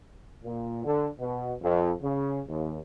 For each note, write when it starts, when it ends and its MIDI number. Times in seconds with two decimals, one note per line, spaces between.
0.44 0.83 46
0.85 1.07 50
1.20 1.54 47
1.62 1.92 41
2.02 2.41 49
2.48 2.79 39